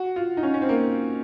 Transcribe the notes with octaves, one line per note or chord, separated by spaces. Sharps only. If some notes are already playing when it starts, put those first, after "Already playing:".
Already playing: F#4
F4
D#4
C#4
C#4
C4
A#3